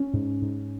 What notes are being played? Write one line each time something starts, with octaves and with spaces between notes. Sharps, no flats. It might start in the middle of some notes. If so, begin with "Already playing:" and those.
Already playing: C#4
G#2
G#2